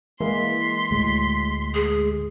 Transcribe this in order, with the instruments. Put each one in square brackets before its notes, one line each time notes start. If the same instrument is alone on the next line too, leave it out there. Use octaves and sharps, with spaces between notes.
[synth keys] E3 G#3 A#3 [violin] C6 B6
[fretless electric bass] D2 A2 [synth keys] G#3
[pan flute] G#4